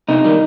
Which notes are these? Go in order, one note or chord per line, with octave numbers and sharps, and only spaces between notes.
C3 D#4
D#3 G3